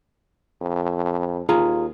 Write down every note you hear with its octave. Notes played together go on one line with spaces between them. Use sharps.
F2
D#2 F4 G#4 A#5